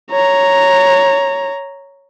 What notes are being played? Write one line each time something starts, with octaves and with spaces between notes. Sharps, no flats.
C#5 A#5